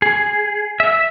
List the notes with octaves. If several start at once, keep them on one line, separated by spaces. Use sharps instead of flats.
G#4
E5